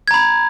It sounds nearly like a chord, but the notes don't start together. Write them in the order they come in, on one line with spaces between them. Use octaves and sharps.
G#6 A#5 B5